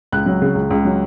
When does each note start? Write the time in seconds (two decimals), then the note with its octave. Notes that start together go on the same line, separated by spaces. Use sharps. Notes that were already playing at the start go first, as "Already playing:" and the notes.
0.12 C#2 F#6
0.26 F#3
0.42 C#3
0.55 C#2
0.71 C#2
0.85 F#3